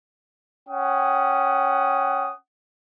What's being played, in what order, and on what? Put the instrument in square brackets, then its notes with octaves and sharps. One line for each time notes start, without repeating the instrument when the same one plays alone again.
[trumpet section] C#4 F#5 G5 D#6